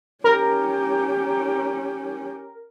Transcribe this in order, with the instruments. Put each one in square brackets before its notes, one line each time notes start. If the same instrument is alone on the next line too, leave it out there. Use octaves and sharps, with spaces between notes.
[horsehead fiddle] C#4 G4 [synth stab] A#4